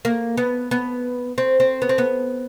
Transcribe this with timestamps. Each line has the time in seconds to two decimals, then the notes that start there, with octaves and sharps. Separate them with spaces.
0.05 A#3
0.37 B3
0.71 B3
1.38 C4
1.60 C4
1.82 B3
1.89 C4
1.98 B3